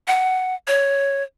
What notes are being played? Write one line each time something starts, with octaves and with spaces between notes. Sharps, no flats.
F#5
C#5